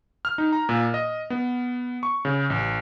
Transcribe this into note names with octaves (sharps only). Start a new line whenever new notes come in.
F6
D#4
A#5
A#2
D#5
B3
C#6
C#3
A1